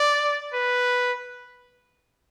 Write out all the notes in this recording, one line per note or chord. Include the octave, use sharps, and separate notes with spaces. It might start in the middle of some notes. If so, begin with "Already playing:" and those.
Already playing: D5
B4